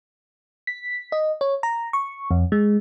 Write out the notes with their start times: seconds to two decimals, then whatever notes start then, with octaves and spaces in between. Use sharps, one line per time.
0.67 B6
1.12 D#5
1.41 C#5
1.63 A#5
1.93 C#6
2.31 F2
2.52 G#3